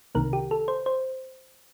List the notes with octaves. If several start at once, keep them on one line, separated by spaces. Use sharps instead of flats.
C2 C3 D#3 A#3 A#4
G4
A4
C5
C5